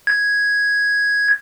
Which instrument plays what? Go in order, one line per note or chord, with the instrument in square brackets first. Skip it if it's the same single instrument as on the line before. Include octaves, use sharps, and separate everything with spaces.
[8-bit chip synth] G#6